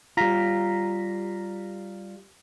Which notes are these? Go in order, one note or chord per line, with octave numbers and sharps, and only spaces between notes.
G3 F4 A#5 A#6 B6